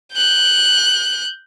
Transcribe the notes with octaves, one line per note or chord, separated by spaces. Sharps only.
F#6 G6